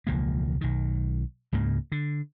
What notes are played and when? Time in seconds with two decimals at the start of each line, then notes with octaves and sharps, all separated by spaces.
0.07 E1 C#2 F3 A#3
0.61 B1 D#3
1.52 C#2 G#2 C#3 A#3
1.92 D3